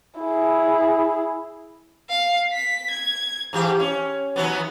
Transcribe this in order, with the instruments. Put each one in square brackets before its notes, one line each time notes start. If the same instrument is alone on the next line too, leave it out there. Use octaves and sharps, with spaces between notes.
[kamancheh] E4 G#4
[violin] F5
B6
G#6
[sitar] G#2 E3 G4
C#4
D#3 F#3 B3